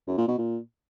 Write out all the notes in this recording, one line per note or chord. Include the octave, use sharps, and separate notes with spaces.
F#2
A#2
B2
A#2